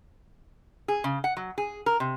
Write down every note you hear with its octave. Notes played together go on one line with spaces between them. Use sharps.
G#4
C#3
F#5
F#3
G#4
A#4
C3